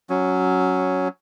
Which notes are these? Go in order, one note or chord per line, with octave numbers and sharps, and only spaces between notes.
F#3 C#4